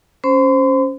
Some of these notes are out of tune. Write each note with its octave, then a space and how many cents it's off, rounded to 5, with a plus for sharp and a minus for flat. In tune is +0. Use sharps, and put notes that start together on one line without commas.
C#4 +0 C5 +0 C6 -45